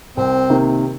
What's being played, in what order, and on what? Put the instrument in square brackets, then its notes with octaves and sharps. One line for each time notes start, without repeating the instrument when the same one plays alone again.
[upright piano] C2 [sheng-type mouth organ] C4
[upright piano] C3 D#3 A#3